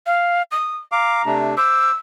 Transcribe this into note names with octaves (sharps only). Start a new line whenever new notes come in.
F5
D#6
F5 A#5 D6
C3 A3 D4
C5 D6 E6